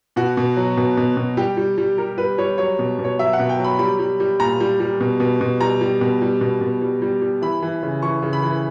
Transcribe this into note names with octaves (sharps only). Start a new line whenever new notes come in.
B2 F#4
B2
F#3
B2
B2
B2
G3 G4
G3
G3
G3 A#4
G3 B4
G3 C#5
F#3 C#5
B2
B2
C#5
F#3 E5
F#5
B2
G5
F#3
B5
G3 B5
G3
G3
A#2 A#5
G3
G3
B2
B2
B2
G3 A#5
G3
B2
G3
B2
B2
G3
G3
G3
E3 B5
E3
C#3
E3 C#6
C#3
B5
E3